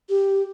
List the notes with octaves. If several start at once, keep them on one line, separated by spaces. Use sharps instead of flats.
G4